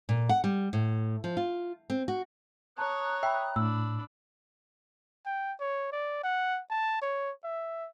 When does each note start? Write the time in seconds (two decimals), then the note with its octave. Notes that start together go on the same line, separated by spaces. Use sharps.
0.09 A#2
0.29 F#5
0.44 G3
0.73 A2
1.24 F3
1.37 F4
1.90 C4
2.08 F#4
2.78 C#5 A5 A#5 D#6 F#6
3.23 E5 G5 B5
3.56 A2 D4 B5 E6
5.26 G5
5.61 C#5
5.93 D5
6.24 F#5
6.70 A5
7.02 C#5
7.44 E5